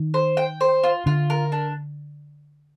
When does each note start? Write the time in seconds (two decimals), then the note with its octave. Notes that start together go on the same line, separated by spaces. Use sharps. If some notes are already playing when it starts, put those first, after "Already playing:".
Already playing: D#3
0.14 C5
0.37 G5
0.61 C5
0.83 F4
1.06 D3 F4
1.30 A#4
1.52 D4